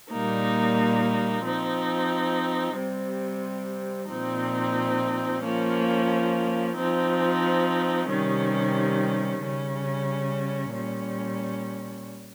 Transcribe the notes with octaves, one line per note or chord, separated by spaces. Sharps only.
A#2 G3 A#3 D#4
F3 C4 D#4
C3 G3 C4
A#2 F3 C4 D#4
F3 A#3 C#4
F3 C4 D#4
C3 D#3 G3 C#4
C#3 G3 C#4
A#2 G3 C#4